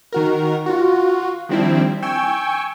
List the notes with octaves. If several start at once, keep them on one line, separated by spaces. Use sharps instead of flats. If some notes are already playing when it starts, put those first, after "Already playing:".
D#3 F#4 A#4
F4 F#4
D#3 F3 G3 C4 D4 E4
G5 G#5 C#6 E6